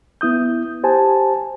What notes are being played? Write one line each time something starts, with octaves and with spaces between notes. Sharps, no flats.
B3 E4 D#6 G6
G4 C5 G#5 A5